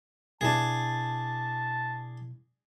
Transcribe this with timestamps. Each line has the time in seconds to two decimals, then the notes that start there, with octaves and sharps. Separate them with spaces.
0.41 B2 D4 E4 G#4 A5